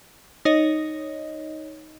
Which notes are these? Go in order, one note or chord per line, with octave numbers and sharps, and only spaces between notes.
D#4 C#5 D#5